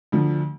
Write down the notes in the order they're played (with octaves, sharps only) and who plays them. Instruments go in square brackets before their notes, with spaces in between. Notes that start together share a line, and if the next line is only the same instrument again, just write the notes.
[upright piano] D2 D3 F3